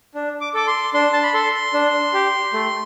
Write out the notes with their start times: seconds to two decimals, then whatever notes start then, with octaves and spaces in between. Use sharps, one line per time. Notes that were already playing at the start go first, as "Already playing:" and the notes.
0.15 D4
0.41 D6
0.54 A4 D6
0.67 C6
0.94 D4 C6
1.13 A5
1.23 B5
1.34 A4 C6
1.74 D4
2.14 G4
2.53 A3